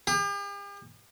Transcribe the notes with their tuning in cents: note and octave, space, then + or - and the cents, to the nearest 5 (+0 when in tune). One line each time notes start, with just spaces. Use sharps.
G4 +45